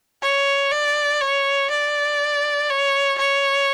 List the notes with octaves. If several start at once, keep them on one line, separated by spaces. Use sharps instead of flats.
C#5
D5
C#5
D5
C#5
C#5